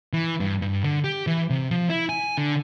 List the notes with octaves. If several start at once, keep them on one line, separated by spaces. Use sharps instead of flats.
E3
G2
G2
D3
G4
E3
C3
F3
E4
G#5
D3